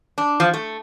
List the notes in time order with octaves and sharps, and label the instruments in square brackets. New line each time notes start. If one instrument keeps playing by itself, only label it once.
[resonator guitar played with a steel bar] D4
F3
A3